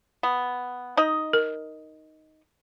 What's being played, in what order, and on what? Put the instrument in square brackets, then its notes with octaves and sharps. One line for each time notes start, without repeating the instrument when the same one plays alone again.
[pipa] B3
D#4 D#5
[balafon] A#4